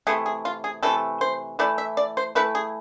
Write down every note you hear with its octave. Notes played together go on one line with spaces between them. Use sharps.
C3 E3 A3 G#4
G#4
F4
G#4
C3 E3 A3 A4
C5
E3 A3 E4 D5
E5
D5
C5
E3 A3 E4 B4
G#4